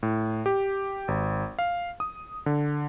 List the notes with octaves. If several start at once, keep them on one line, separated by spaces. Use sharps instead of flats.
A2
G4
G#1
F5
D#6
D3